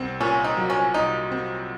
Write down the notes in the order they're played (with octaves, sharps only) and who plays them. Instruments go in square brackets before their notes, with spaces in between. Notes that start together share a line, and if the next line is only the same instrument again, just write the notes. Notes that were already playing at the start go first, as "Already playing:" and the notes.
Already playing: [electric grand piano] C2 C4
[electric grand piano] A#2 [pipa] C#4
[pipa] D#4
[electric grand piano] F#3
[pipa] C#4
[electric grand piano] C2 [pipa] D#4
[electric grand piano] C4